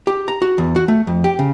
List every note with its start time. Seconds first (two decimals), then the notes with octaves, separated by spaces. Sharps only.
0.07 G4
0.28 A#5
0.42 F#4
0.58 E2
0.76 F#4
0.88 A3
1.07 F2
1.24 G4
1.39 C#3